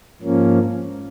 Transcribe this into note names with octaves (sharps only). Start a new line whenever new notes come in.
G#2 F3 A#3 C#4